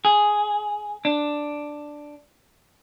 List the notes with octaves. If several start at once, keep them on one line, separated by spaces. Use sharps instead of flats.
G#4
D4